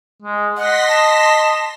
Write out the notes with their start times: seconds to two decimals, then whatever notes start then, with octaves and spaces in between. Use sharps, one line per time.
0.22 G#3
0.57 D#5 F#5 C6 A#6 B6
0.88 A5